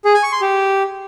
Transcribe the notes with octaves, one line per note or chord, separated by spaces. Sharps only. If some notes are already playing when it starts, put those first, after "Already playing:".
G#4
G#5
C#6
C6
G4